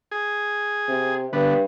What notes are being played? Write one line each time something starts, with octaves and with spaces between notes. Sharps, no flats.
G#4
C3
G2 D3 B3